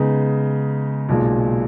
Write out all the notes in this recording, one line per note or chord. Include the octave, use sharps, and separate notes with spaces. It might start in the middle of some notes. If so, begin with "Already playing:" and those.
Already playing: C#3 G#3 B3 D#4
B1 A#2 G#3